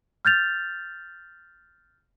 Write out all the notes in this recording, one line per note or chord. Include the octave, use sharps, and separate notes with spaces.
F6 G6 A6 F7